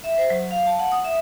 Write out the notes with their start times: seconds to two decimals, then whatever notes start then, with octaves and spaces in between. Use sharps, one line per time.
0.04 E5
0.18 C5
0.30 F#3
0.51 F5
0.67 A5
0.79 F#5
0.92 D#6
1.04 E5